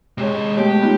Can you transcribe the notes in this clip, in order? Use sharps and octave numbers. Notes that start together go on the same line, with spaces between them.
C3 G#3 C#5
B2 A3 G4
B3 D#4 F4